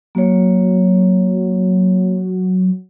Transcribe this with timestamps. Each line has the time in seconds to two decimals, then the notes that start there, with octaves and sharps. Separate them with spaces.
0.15 F#3 A#3 C#5